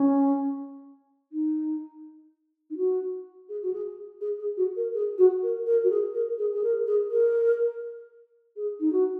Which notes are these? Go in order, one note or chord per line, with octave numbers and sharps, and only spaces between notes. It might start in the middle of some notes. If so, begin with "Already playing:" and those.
Already playing: C#4
D#4
D#4
F#4
G#4
F#4
G#4
G#4
G#4
F#4
A#4
G#4
F#4
A#4
A#4
F#4
G#4
A#4
G#4
G#4
A#4
G#4
A#4
G#4
D#4
F#4